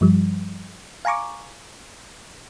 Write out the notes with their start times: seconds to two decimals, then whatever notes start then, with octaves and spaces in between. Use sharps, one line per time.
0.01 G2 F3 G3
1.05 F5 G#5 A#5 C#6 D6